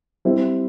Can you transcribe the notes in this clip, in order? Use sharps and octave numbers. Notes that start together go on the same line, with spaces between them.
G3 C4 E4